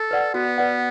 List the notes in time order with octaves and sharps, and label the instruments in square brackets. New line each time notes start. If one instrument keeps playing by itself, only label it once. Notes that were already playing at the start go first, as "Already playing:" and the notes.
Already playing: [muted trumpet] A4
[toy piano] B4 D5 F#5
[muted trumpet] B3 [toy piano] F#4
[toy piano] B4 D5 F#5